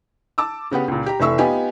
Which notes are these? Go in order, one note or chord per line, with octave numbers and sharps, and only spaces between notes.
A5 D6 E6
C#3 B3 G4 F#5
C#2 A#2
G4 A#5
F1 E3 A3 E5 C#6 E6
B3 D#4 F4 G4 G#5